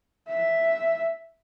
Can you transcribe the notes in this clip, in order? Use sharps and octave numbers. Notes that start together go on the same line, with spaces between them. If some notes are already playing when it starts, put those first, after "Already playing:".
E5